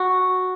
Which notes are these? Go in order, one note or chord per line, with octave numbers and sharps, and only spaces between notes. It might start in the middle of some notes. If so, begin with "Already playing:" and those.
Already playing: F#4